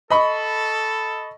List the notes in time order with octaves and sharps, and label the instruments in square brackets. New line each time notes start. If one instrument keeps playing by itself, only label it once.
[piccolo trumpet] A4 [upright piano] D#5 B5 C#6